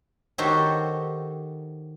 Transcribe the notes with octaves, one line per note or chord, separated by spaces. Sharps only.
D#3 F#4 G4 A4 C5 C#5